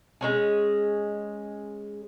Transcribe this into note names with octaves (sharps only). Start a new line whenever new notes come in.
G#3 C#4 G#4